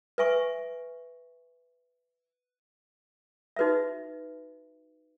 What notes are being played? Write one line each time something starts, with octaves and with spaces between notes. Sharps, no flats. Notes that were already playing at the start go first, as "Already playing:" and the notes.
B4 E5 G#5 C#6
D#4 F#4 B4 E5